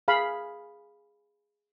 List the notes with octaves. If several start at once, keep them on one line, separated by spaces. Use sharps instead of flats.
G#4 F5 B5